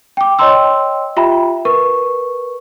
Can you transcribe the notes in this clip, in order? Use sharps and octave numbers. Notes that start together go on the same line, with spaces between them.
G5 D6
C#5 D#5 G5 A#5 C6 E6
F4 G4 E5 G5 A#5 B5
A#4 B4 C#6